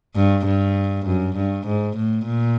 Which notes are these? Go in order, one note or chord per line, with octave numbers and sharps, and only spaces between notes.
G2
G2
F#2
G2
G#2
A2
A#2